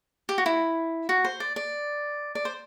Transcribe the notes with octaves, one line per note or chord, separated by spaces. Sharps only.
G4
F#4
E4
F#4
C5
D5
D5
D5
C5